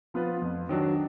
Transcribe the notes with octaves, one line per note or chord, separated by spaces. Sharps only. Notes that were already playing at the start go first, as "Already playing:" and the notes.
F3 B3 F4 B4
F2
D#3 F#3 D4